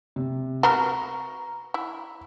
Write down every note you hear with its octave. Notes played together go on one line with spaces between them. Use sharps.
C3
B3 F#4 A#4 A#5 C#6
E4